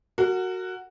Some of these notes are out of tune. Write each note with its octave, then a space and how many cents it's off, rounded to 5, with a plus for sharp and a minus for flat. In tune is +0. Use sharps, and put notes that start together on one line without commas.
F#4 +0 A#4 -35